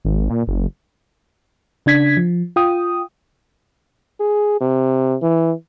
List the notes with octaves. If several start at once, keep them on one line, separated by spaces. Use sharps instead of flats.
G#1
A#2
F#1
C#3 D4 G#6 B6
F3
F4 G5 D#6
G#4
C3
E3